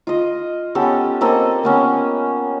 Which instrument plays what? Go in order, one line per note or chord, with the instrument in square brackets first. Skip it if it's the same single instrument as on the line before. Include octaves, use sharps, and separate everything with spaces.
[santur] F4 D#5
B3 C#4 G4 A4
A#3 C4 A4 D#5
A#3 B3 C#4